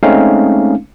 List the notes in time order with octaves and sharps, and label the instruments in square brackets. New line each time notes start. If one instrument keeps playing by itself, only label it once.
[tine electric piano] G#3 A3 C4 C#4 D#4 F5